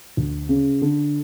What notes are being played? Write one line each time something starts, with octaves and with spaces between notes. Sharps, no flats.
D2
C#3
D3